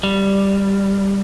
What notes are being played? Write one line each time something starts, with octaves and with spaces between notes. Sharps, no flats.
G3